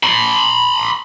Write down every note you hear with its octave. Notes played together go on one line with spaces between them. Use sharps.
B5 C6